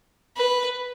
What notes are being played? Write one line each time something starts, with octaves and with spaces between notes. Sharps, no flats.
B4